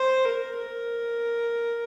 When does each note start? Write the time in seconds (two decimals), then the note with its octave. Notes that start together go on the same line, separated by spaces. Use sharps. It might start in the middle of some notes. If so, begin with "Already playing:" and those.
Already playing: C5
0.25 A#4
0.57 A#4